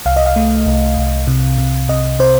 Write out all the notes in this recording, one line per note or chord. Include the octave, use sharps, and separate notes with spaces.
C2 F5
D#5
F5
A3
C2
C2
C3
C3
C3 D#5
C3 C5